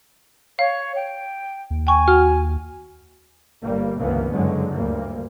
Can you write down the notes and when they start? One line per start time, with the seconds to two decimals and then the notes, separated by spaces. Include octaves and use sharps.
0.59 C#5 F5
0.96 G5
1.70 D#2
1.87 G5 G#5 C#6
2.08 F#4 F6
3.62 G1 G3 A#3
3.99 G1 C#2 E3 F3 A#3 B3
4.31 F#1 G2 D3 F#3 G#3
4.74 D2 G2 G3 A#3